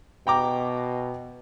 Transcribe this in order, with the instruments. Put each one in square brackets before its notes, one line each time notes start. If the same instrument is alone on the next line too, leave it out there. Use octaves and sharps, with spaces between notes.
[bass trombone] B2 [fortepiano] G5 A#5 D6